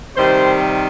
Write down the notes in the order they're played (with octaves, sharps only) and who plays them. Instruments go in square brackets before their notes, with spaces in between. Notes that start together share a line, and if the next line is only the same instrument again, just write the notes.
[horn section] C3 D#3 G3 C5